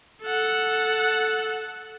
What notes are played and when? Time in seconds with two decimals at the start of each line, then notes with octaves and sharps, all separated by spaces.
0.22 A4 F#5